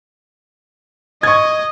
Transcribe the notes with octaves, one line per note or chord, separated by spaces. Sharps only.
D#5 C#6 G#6